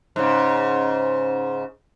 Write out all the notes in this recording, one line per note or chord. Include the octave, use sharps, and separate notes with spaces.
G#2 C#3